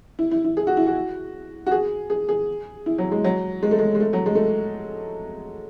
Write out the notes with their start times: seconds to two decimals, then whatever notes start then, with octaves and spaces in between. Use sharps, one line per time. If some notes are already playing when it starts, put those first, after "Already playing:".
0.19 E4
0.31 E4
0.44 E4
0.57 G#4
0.67 F#4
0.77 E4
0.87 F#4
1.66 F#4
1.71 G#4
2.10 G#4
2.29 G#4
2.86 E4
2.98 F#3
3.11 G#3
3.24 F#3
3.63 G#3
3.71 A3
3.79 G#3
3.95 G#3
4.00 A3
4.13 F#3
4.26 G#3
4.35 A3